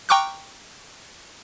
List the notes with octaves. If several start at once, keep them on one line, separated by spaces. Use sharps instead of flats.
G5 A#5 C#6 D6 F6 F#6